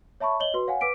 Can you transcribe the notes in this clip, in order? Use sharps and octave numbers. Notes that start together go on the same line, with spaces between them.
C#5 E5 A5 B5 C#6
C#5 D#5 F#7 G7
F#4 B4 C6
C#5 F5 F#5 G#5
B4 D6 B6 D7